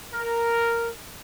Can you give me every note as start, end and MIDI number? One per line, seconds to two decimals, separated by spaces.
0.14 0.89 70